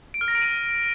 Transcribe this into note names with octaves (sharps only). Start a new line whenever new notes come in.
D7
F6
A#6
D7
D#7